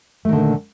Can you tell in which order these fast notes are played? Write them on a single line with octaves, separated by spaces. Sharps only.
A3 D#3 D3 A#2